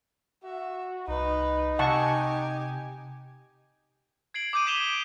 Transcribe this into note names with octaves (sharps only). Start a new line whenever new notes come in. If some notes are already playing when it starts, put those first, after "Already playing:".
F#4 E5
C2 D#4 B4
C3 G4 F#5 G#5 A5 C#6
G#6 C7 D7 F#7
D6 D#6 G6 D7 D#7
D6 G6 B6 E7 F7 G7
D7